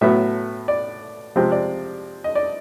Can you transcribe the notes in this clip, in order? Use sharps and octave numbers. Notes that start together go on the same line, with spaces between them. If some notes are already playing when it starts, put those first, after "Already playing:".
A2 F#3 B3 E5
D5
C3 F3 G#3 C4
D5
D#5
D5